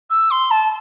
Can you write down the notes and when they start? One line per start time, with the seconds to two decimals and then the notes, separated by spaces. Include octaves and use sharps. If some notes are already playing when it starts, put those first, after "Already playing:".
0.10 E6
0.31 C6
0.51 A5